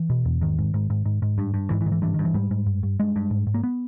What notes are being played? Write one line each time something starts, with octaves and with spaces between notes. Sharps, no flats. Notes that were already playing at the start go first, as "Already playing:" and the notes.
Already playing: E3
B2
E2
G#2 D#3
G#2
G#2
G#2
G#2
G#2
G2
G2
G#2 E3
E3
G#2 D#3
E3
G2 E3
G2 D#3
E3
G#2 G3
G#2
G2
G2
G2 G#3
G2
G#2
G#2
A#3
B3